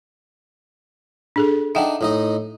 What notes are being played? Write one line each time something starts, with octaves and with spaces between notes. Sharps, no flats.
D4 G#4 A4
D4 D#4 E5 F#5 G5
A2 D#4 D#5